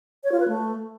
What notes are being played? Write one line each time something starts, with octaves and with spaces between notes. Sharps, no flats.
C#5
F4
B4
A3